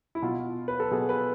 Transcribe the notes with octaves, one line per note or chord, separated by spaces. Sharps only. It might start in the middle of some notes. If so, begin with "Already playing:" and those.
E4
B2 F4
B4
A4
B2 G#4
B4